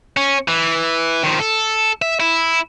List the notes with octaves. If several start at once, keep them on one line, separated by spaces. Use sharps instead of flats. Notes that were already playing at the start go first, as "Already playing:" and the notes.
C#4
E3
D#3 F3
A4
E5
E4